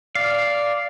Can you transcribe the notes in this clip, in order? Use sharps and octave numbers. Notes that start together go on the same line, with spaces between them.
D5 F5